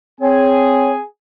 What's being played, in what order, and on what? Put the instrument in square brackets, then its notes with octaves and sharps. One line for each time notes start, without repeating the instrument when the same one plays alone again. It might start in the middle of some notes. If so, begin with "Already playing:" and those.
[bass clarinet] C4 [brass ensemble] G#4 G#5 [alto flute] C#5